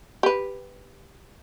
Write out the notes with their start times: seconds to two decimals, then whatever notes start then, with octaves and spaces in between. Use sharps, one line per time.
0.23 G4 B4